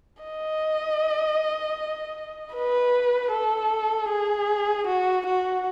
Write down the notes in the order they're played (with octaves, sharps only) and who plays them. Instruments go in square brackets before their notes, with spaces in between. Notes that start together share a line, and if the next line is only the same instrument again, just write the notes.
[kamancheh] D#5
B4
A4
G#4
F#4
F#4